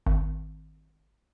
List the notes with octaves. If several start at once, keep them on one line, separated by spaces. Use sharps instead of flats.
G#1